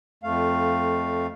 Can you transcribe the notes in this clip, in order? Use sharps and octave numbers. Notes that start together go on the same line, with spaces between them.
F2 A3 F5